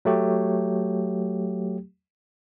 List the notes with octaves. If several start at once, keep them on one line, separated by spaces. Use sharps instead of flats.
F#3 A3 G4